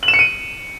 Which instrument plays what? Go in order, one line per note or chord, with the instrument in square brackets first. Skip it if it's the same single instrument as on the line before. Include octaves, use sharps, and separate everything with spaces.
[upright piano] F#7
E7
C#7
D#7